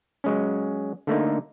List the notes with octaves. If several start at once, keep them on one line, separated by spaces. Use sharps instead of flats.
F#3 G#3 C#4
D3 A3 A#3 D#4